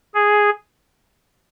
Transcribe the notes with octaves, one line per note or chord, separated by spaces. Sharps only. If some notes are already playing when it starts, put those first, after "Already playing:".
G#4